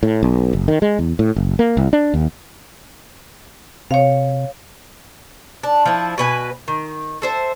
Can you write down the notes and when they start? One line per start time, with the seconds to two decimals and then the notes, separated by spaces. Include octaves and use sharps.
0.03 A2
0.23 B1
0.53 F#1
0.68 D#3
0.82 G#3
0.99 E2
1.19 A2
1.36 F#1
1.59 A#3
1.77 C2
1.93 D4
2.14 D#2
3.91 C3 C#5 F5
5.63 D4
5.86 F3 E4
6.18 B2 B4 G#5
6.68 D#3
7.22 A4 C5 E5